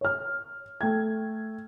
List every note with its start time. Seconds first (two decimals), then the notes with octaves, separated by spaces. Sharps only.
0.01 C#5 F6
0.81 A3 G5 G#6